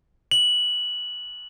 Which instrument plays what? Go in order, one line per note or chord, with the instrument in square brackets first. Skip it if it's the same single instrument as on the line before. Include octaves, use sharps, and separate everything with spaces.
[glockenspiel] F#7